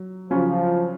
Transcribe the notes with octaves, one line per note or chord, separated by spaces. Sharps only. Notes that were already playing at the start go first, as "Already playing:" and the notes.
Already playing: F#3
C#3 F3 F#3 C#4 F4